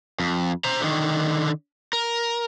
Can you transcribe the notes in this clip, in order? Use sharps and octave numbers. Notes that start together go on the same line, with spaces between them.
F2
C5 A#5
D3 D#3
A#4